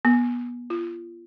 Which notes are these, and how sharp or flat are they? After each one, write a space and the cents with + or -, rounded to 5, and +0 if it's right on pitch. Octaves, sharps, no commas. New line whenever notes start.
B3 -25
F4 -30